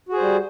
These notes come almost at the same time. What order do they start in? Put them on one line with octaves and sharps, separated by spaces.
F#4 G#4 C5 G3